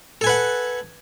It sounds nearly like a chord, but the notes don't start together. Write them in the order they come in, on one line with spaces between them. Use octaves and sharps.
A4 G#5 B4 F#5